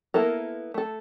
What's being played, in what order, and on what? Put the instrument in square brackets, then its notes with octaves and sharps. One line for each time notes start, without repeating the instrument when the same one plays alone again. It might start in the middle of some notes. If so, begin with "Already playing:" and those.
[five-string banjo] A#3 B3 E4 A4 A#4
A3 A4